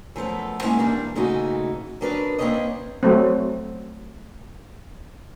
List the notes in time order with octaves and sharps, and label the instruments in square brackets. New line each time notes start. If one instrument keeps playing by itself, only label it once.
[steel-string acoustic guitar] F#2 F3 A3 B3
G#3 A#3 B3 C#4 E4
E3 G3 A#3 D4
A#2 C#3 E3 A3 D#4 F#4
F#3 B3 D4 A#4 B4
A#3 C4 D4 B4 C#5 D#5
[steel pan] F#3 A3 C4